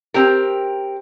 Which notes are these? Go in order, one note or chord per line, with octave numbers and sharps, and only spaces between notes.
C4 G4 A#4